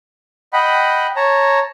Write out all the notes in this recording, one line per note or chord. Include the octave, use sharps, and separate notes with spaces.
D#5 F#5 G5 B5
C#5 A5 A#5